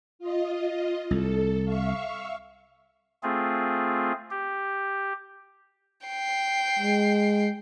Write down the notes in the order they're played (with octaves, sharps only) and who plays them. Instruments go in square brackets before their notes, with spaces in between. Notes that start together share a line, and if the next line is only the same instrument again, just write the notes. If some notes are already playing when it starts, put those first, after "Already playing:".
[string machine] F4 D#5
[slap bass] C2 [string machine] A4
[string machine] E5 F5 C#6
[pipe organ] A3 C4 F4 G#4
G4
[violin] G5 C7
[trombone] G#3